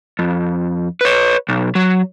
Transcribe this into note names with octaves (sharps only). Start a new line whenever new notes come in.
F2
B4 C#5
B1
F#3